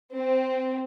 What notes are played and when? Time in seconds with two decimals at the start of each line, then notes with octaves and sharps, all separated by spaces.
0.15 C4